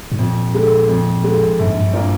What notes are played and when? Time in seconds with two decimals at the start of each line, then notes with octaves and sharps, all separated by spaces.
0.12 G#2
0.19 F2 A#2
0.54 D3 G#3
0.89 F2
1.24 D3 G#3
1.59 A#1 G2
1.69 G#2
1.80 G2
1.93 A#2 F3 A#3 D4